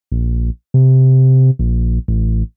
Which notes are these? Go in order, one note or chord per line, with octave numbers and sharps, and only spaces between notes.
A#1
C3
A#1
A1